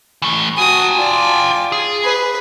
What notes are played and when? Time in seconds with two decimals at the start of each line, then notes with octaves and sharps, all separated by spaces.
0.22 E3 A3
0.58 F#4 G5 G#5 D#6
0.96 F4 D5
1.72 G#4
2.04 B4